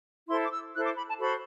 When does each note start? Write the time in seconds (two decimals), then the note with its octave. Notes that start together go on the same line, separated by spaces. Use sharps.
0.29 E4 A4 C5 C6
0.45 D6
0.52 E6
0.75 E4 A4 C5 F#6
0.86 D6
0.97 B5
1.08 A5
1.19 F#4 A4 C5 B5